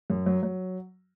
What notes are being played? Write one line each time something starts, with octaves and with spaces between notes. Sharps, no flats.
F#2
F#3
F#3